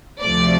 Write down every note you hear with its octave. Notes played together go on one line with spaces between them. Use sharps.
D2 C3 F3 A3 D5